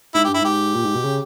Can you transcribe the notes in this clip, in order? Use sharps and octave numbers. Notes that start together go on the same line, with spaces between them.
G#2 E4
G4
G2
E4
G#2 G4
A#2
G#2
B2
C#3